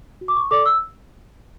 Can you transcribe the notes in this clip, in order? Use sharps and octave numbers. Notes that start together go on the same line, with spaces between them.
F#4
D6
C#6
A4 D5 D6
E6